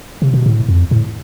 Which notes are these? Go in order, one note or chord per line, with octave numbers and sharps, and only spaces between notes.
C3
B2
A2
F2
A2